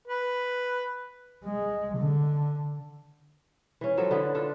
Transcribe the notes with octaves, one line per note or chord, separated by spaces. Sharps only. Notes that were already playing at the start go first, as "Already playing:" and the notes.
B4
G#3
D3
E3 C#4
F3 F#3 A4
D3 B3 E4
D4 F4 A4